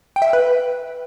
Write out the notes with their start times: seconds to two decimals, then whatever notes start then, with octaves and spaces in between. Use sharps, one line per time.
0.16 G5
0.22 E5
0.28 F5
0.33 B4